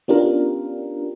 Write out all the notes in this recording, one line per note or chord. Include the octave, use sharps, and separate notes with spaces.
B3 C#4 D4 F4 G4 A#4